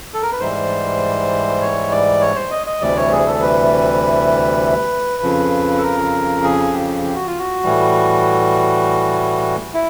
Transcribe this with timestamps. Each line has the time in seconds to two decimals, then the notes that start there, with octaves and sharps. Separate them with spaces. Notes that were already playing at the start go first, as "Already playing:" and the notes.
0.14 A4
0.22 A#4
0.32 B4
0.39 G#2 E3 G3 C5
1.61 C#5
1.91 D5
2.21 C#5
2.35 C5
2.51 D#5
2.67 D#5
2.81 D2 C3 E3 G3 D5
2.97 C#5
3.12 G#4
3.27 A4
3.42 B4
5.23 F2 C#3 F3
5.78 A4
5.83 A#4
6.44 G#4
6.73 G4
7.04 G4
7.15 F#4
7.27 F4
7.39 F#4
7.63 A2 E3 G3
9.74 E4